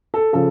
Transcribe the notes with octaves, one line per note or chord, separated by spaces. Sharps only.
A4
C#3 F3 A4